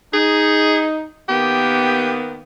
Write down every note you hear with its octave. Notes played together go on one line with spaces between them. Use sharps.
D#4 G#4
D#3 A#3 B3 G4